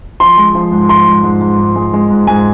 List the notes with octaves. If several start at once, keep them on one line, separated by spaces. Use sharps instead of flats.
F3 C6
G#3
F3
G#2
F3 C6
G#2
G#2
G#2
G#2
G#3
G#3
G#2
G#2 G#5